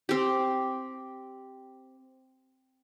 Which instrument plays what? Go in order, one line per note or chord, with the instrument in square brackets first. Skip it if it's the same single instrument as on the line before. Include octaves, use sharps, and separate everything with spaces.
[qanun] C4 G4